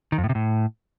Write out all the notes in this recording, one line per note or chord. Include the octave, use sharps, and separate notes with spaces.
D#3
F2
A2
C3
A2